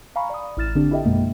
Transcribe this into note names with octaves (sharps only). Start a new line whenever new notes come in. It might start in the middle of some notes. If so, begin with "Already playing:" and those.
F5 G#5 A#5 B5 C#6
D5 D#6
A1 E4 F6 A6 E7
D3 C4 D4 G4
E4 G4 A4 D#5 E5 G5
F#2 B2 G#3 A#3